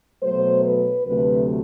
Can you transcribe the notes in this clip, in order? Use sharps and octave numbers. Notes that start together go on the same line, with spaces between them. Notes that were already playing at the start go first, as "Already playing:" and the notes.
B2 F#3 A3 C5
B4
D2 C3 F#3 A3 B4